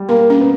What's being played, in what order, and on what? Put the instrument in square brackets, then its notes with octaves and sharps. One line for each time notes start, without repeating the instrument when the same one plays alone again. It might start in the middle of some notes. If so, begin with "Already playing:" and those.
Already playing: [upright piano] G3
[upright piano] A#3 [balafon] A#4
[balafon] C#4
[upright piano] B3